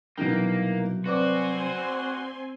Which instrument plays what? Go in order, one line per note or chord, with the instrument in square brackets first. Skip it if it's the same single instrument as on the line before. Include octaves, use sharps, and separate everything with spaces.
[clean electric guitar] C2 F#3 G5 [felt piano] B2 E3 D#4 [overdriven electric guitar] A#3
[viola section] C4 G#5 C6 [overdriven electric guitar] F#4 [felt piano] B4 D5 D6